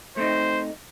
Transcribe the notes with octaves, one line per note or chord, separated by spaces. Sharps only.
A3 C4 D#4 C5